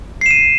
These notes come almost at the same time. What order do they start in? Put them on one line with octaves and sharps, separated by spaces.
C7 E7 D#7